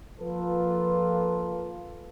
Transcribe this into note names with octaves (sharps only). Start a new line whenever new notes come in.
F3 A#3 F4 A4 B4